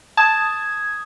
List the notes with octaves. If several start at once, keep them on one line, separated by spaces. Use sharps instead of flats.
A5 D#6 G#6